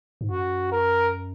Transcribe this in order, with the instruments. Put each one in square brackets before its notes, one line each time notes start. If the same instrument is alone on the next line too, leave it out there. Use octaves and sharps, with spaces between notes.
[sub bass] G#2
[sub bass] F#2 [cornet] F#4
[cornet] A#4